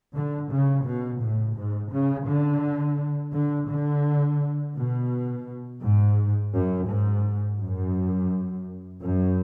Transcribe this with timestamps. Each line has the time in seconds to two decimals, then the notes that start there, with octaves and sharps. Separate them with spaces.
0.15 D3
0.51 C#3
0.86 B2
1.22 A2
1.57 G#2
1.92 C#3
2.28 D3
3.34 D3
3.70 D3
4.76 B2
5.82 G#2
6.54 F#2
6.88 G#2
7.60 F#2
9.01 F#2